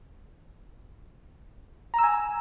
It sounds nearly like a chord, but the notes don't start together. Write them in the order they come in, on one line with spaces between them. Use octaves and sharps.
A#5 E6 G#5